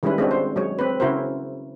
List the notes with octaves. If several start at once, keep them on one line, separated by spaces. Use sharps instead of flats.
D#3 G3 G#3 C#4 E4 B4
G#3 C4 D4 F#4
C5
F#3 G#3 C#5
C4 B4
C#3 E4 F#4 A#4 C5